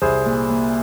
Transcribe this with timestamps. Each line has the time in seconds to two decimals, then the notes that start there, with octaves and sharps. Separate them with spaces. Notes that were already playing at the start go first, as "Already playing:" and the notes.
0.02 C2 G#4 C5
0.26 A#2
0.49 A#2